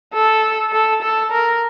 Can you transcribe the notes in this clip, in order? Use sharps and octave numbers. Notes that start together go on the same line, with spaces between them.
A4
A4
A4
A#4